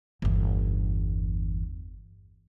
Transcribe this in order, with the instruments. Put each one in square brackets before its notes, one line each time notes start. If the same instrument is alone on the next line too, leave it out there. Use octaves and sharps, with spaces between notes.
[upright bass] G1 E2